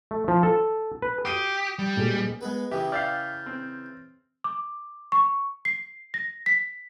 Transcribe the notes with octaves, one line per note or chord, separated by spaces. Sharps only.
A3
F3
A4
B4
G4 D#6 C7 D#7
G3
D#1 G#3
G#3 B3 B4
C#3 E3 G4 E5 G5 D#6
D5 E5 F5 F6 G6 A6
C4
D6
C#6
C7
A#6
B6